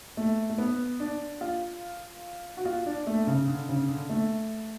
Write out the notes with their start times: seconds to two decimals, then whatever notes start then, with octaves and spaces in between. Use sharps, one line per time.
0.17 A3
0.50 A3
0.58 B3
1.00 D4
1.41 F4
2.57 F#4
2.65 F4
2.86 D4
3.07 A3
3.27 C#3
3.48 D3
3.69 C#3
3.89 D3
4.09 A3